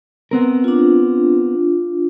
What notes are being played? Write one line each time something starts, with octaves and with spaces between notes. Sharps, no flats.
B3 C4 A#4
D4 F4